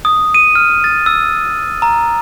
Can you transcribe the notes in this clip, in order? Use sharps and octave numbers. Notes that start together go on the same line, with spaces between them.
D#6
D#7
F6
A6
E6
A#5